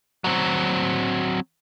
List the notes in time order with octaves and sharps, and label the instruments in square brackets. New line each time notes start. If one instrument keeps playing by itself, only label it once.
[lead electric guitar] F#3 C4